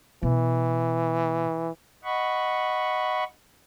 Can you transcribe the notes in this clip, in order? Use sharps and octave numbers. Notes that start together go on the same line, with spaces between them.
B2 E3
D#5 F#5 B5 C#6